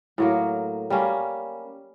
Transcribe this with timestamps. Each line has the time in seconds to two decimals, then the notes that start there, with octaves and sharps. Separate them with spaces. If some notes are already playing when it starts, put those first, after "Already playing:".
0.18 A2 F#3 A#3
0.90 G3 A#3 C#4